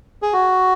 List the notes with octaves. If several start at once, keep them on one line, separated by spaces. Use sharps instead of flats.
G#4
F#4